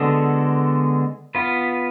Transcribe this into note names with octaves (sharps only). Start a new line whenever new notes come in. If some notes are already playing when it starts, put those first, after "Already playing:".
Already playing: D3 G#3 B3 F#4 A4
B3 F4 B4